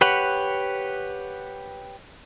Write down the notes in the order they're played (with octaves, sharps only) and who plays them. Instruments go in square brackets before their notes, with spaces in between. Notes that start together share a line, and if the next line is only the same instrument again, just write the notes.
[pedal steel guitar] G4 B4 C#5 F#5